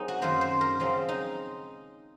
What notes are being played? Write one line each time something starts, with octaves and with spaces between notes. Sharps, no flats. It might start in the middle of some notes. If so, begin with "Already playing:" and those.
Already playing: F#3 C4 D#4 G#4 A#4
F#4
F#2 D#3 A#3 C5
C5
A#4
C#3 F3 G#3 C4
D#4